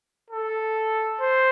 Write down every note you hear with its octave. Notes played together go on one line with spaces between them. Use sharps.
A4
C5